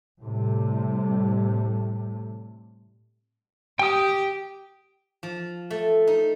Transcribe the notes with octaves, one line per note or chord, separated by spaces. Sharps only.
A2 C3 G3 A3
G4 G5 D#6
F3
A3
D#4